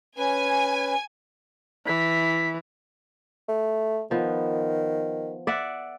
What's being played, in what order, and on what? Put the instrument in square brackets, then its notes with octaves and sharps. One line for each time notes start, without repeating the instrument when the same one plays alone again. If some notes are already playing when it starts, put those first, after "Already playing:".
[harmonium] C#4 B4 [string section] G#5
[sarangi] E3 [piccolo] B6
[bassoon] A3
[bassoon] D#3 [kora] F3 B3
[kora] D5 E5 F#5